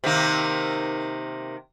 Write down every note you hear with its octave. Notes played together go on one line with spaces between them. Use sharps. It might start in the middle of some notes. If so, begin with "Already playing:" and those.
C3 D#3 A#3